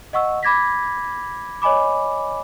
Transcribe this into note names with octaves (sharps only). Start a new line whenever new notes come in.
D#5 F#5 C#6 E6
B5 D6 G#6 A#6 B6
C#5 D#5 G#5 B5 D6